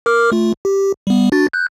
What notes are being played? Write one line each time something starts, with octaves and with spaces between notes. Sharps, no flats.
A#4 D6 F6
A3 F4
G4
G3 B3
D4 F#4 A6
F#6 G6